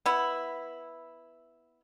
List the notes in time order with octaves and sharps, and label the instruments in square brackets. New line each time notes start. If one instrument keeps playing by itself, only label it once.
[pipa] B3 E4